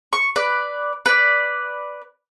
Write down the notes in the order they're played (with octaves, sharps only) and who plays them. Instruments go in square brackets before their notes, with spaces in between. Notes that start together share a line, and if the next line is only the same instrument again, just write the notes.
[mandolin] C#6
B4 D5
B4 D5